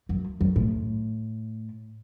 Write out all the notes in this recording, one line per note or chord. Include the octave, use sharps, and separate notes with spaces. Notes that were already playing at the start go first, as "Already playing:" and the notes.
F#2
F#2
A2